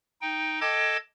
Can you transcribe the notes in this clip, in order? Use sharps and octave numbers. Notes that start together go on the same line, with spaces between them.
D#4 G5
A4 D#5 G5 A5 D6 G#6